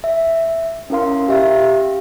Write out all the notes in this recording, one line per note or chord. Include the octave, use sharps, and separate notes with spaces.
E5
C#4 E4 A#4 F5 C6
G4 E5 F5